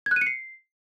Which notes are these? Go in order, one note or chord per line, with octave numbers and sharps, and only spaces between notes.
G#6
F#6
D#7
C#7
C7